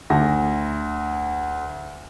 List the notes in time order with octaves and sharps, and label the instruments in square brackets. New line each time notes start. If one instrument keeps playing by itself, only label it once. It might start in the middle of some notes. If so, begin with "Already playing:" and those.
[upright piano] D2 A5 A#6